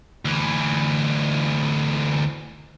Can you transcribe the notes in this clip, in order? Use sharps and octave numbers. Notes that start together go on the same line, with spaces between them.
D2 E3